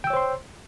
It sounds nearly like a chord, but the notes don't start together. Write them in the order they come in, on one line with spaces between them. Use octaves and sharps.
G5 E6 C#5 C5 C6